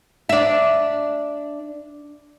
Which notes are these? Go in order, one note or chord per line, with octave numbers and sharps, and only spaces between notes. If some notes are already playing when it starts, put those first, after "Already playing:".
D4 E5